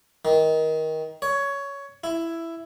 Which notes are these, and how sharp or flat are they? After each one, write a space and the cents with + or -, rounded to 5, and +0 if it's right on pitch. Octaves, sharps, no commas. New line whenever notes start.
D#3 +20
C#5 +15
E4 +10